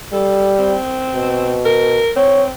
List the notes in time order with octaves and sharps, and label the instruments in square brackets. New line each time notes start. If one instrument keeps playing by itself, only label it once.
[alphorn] G3 [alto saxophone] A4
[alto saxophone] C4
[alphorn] B2
[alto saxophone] A#4
[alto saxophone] C4 [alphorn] C#5